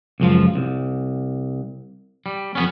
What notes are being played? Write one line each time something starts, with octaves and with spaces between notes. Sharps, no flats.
C#2 F#2 F3
C2
G3
F2 B3 C#4